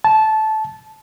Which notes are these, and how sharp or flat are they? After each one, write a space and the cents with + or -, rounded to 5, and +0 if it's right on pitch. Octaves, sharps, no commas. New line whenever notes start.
A5 -15